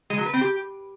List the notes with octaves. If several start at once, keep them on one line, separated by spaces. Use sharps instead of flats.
G#3
F#3
B4
C4
G4